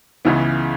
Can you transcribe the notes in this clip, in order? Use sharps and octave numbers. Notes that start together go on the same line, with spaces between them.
C#2 C#3 E3 B3